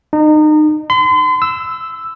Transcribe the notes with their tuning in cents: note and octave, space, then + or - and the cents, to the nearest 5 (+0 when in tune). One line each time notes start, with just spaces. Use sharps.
D#4 -30
C6 -40
E6 +0